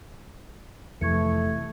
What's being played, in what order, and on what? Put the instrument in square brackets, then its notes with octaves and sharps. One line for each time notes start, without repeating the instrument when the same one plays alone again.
[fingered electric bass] F2 [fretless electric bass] C3 E3 [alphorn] A3 [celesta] C#6 G#6 C#7